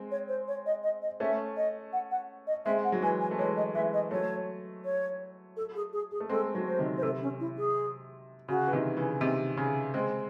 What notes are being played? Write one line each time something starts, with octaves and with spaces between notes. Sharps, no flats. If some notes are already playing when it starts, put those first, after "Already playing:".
Already playing: G#3 C4
C#5
C5
C#5
D#5
D#5
D#5
A3 C#4 E5
D#5
F#5
F#5
D#5
G#3 C4 E5
F#5
F#3
E3 G#3 G#5
G#5
A3
E3 G#3 C#5
D#5
E3 G#3 E5
D#5
F#3 A3 C#5
C#5
A4
G#4
G#4
G#4
A3
G#3 C4 A4
F#3 A3
C5
C3 D#3
C5
C3 A4
C#4
E4
G#4
C#3 F#4
E3
C3 D#3
C#3 E3
C3 D#3 C4
C#3
G#3 C4